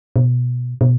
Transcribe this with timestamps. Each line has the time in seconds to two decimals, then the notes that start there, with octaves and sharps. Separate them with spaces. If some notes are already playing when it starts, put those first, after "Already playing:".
0.16 B2
0.81 B2